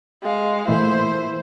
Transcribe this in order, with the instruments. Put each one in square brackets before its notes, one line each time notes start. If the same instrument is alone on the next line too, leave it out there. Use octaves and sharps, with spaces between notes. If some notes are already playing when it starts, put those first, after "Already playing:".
[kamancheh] G#3 F5
[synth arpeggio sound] A#2 E3 A3 [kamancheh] E4 C5